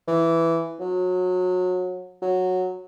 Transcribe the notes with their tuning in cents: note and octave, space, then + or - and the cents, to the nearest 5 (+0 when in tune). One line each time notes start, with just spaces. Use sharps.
E3 +5
F#3 -25
F#3 -10